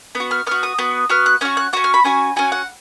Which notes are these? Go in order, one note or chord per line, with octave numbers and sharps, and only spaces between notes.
B3
F#4
F6
B3 F#4 F6
D#6
B3 F#4
B3 F#4 F6
F#6
C#4 F#4 F6
F#6
C#4 F#4 F#6
F6
B5
C#4 F#4 G#5
C#4 F#4 G#5
F#5